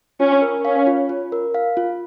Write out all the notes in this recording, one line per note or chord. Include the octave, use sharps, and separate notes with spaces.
C#4 F4
A#4
C#4 F5
F4
F4
A#4
F5
F4